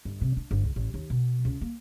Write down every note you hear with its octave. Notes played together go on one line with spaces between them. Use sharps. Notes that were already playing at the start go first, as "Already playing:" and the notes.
G1
C3
D4
G1
C#2
A1
D#2
B2
C#2
A#3